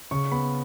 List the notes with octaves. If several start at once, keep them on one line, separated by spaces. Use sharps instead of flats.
C#3 C#6
B3 B5